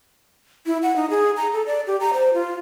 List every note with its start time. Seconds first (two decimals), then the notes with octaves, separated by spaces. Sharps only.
0.66 E4
0.83 F#5
0.96 D#4
1.10 G#4
1.37 A#5
1.53 A4
1.66 D5
1.87 G4
2.00 A#5
2.14 C5
2.34 F4